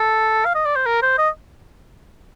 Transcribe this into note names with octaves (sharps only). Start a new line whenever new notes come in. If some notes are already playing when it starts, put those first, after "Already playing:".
Already playing: A4
F5
D#5
D5
C5
A#4
C5
D#5